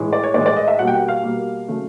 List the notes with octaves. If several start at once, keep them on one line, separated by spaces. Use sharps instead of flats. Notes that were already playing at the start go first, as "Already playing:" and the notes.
Already playing: A2 E3 G#3
D5
C#5
A2 E3 G#3 D5
D5
D#5
E5
B2 G3 A#3 F#5
G5
F#5
F5
B2 G3 A#3
C#3 F#3 A3